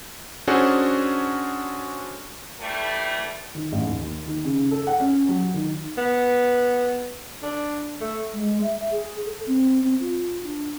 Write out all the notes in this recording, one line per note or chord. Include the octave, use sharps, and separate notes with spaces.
C#4 D4 F#4 G#4 A4 C5
E3 G3 A3
D#3
A1
D#2
D#3
C#3
A4
F#5
C#4
F#3
D#3
B3
D4
A3
G#3
E5
G#4
A4
C4
C4
F4
D4